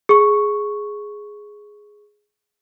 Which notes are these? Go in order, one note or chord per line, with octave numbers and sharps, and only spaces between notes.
G#4 C#6